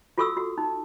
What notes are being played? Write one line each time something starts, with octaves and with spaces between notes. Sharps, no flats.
F4 F#4 A4 C#6 D#6 E6
F#4
D#4